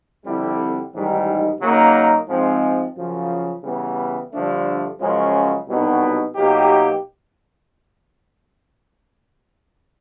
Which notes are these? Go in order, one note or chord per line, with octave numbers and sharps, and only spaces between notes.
F2 D3 G3 C4 E4
A1 G#2 D#3 G3
C#3 F#3 A#3 D#4
G#2 F3 G#3 C4
F#2 C#3 F3
C#3 E3 G3 B3
G2 D3 F3 A3 D4
F#2 C#3 F3 G#3 C#4
C2 B2 F#3 B3 D#4
B2 F#3 A#3 D#4 G4